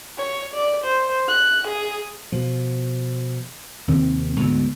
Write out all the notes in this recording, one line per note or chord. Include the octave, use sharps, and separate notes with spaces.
C#5
D5
C5
F#6
G#4
B2 F3
D#2 C3 D#3 C4
D2 G#2 D3 B3